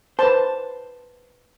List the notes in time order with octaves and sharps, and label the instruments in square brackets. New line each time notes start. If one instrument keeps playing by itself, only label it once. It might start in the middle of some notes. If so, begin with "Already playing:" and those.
[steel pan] B4 A5 [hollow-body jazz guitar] C5